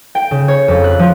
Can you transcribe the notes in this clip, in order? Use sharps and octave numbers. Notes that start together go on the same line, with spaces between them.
G5
C#3
C#5
F2
F#6
F3